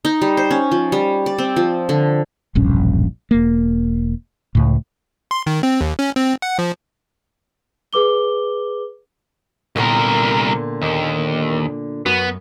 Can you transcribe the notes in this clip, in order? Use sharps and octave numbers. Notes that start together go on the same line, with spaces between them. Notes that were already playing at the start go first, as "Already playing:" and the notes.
D#4
G3
C5
C#4
F3
G3
D5
C4
F3
D3
E1 A#1 G2 C#4
E1 A#3
C#2 A2
C6
D#3
C4
D#2
C#4
C4
F#5
F3
G#4 B4 D6 G7
C2 A#2 D3 B3 A#4
D#2
F#2 B3 F#4